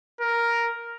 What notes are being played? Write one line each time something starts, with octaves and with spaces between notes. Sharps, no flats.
A#4